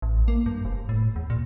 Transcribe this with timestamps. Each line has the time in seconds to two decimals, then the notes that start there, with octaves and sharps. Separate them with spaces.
0.02 A1
0.28 A#3
0.46 G2
0.65 F1
0.89 A2
1.16 E2
1.30 A#2